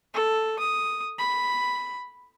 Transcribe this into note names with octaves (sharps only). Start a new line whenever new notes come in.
A4
D#6
B5